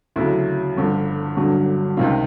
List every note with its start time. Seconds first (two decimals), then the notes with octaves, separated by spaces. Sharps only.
0.16 D2 C#3 F#3 E4
0.77 G1 G2 D3 F3
1.37 G1 G2 D3 F#3
1.97 C#2 C3 D#3 F4